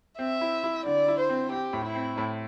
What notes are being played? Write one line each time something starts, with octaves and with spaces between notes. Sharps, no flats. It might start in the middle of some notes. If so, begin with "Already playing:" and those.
C4 E5
E4
E4
D3 D5
E4
C5
C4
C4 G4
A2
E4
C4
A2